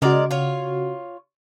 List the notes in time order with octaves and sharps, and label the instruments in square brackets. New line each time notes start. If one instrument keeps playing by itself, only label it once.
[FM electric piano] C#3 F#4 [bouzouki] G#3 A#4 D5
[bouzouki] F4 C#5